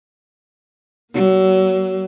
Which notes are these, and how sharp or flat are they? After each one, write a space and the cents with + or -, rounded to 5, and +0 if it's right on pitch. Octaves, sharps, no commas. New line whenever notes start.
F#3 +30 A#3 +30